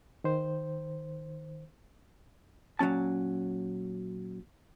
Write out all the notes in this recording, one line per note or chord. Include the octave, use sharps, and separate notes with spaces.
D#3 C5
A#2 F#3 G#3 C#4 A5